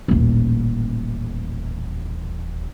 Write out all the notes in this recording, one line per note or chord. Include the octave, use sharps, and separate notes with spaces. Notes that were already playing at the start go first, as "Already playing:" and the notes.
D#1 A1